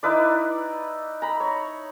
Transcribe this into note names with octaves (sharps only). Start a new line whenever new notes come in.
D#4 E4 B4 D5
A#5 B5
C#5